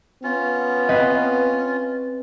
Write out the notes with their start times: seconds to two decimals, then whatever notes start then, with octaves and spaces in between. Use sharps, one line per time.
0.24 B3 C#4 F4
0.89 C4 B4 D#5